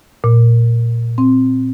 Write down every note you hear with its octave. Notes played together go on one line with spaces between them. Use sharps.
A#2
C4